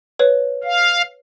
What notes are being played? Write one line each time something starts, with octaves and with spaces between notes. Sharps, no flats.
B4 C#5
F5